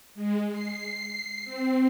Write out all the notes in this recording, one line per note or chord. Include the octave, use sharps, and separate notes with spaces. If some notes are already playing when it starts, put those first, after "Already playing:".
G#3
C7
C4